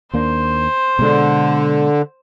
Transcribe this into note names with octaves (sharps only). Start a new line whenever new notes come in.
D#2 A#3 D4 C5
B2 D3 G#3 D4